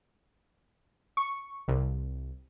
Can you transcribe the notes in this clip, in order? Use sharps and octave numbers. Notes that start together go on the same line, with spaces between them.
C#6
C2